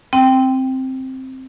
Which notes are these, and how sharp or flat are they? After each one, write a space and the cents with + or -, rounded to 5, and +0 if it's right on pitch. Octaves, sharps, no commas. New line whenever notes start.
C4 +5 G5 +0